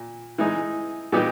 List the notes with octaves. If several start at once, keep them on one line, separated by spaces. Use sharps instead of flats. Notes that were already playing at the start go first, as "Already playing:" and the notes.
Already playing: A#2
E3 G#3 D#4
A#2 G3 B3 D#4 G4